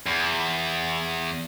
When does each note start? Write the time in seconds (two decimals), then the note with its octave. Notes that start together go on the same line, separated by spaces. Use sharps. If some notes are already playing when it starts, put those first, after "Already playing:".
0.06 E2